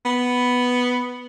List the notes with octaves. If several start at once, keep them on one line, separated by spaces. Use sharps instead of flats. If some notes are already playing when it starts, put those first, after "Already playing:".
B3